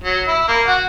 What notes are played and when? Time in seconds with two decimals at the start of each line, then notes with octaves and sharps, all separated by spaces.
0.04 F#3
0.28 E4
0.48 A#3
0.67 F#4